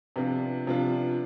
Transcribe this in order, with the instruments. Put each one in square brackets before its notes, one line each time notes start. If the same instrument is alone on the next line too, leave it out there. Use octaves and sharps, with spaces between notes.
[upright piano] C3 F3 B3 D4 F4
C3 F3 B3 D4 F4